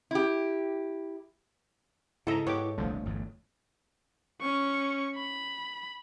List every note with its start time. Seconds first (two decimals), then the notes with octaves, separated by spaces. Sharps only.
0.11 E4 G4
2.27 G#2 C#3 E4 A4 D#5 E5 A#5
2.47 G#2 B3 G4 C#5 D6
2.78 D#1 C2 D3 F3 A3
3.05 G1 E2 G2
4.41 C#4 C#6
5.16 B5